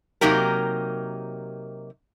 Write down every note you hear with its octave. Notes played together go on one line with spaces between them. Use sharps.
C3 F#3 A#3 D#4 G4 A#4